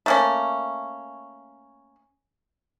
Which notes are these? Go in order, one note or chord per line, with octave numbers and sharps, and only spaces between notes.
A3 A#3 C#4